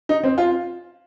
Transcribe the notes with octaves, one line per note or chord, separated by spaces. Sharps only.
D#4
C4
F4